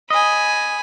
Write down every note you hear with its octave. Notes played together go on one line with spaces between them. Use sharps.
D#5 G#5 B5